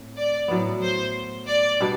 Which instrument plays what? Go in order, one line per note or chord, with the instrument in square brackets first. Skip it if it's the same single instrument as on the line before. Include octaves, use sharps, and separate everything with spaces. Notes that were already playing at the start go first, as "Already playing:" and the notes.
Already playing: [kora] A2 C4
[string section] D5
[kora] A2 F#3 B3
[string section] C5
D5
[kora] B2 G3 D4